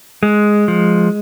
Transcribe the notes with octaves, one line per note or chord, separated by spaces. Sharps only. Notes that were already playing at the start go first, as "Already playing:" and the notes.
G#3
F3